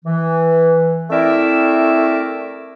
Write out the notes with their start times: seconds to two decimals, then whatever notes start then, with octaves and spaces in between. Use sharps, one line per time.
0.05 E3
1.10 A3 C4 E4 A#4 D5 E5